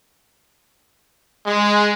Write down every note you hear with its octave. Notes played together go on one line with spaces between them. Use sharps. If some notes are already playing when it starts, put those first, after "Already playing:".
G#3